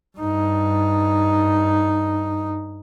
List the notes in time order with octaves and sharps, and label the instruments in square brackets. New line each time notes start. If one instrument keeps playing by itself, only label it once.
[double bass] G2 D#4